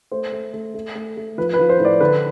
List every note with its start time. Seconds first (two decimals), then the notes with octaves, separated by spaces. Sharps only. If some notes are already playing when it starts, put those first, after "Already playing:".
0.11 A3 C5
0.32 A3
0.54 A3
0.74 A3
0.95 A3
1.17 A3
1.38 F3 B4
1.54 B4
1.59 F3
1.69 C5
1.80 A2
1.85 D5
2.00 D3 B4